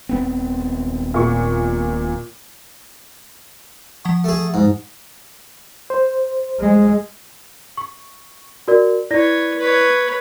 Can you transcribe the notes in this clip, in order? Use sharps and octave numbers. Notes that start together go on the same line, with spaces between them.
D#1 B3 C4
A#2 C#6
F3 F#5 C#6
A3 G#4
G#2
C5
G#3
C#6
F#4 A#4 D5
E4 B4 C#5 D5 A#6
B4 C#5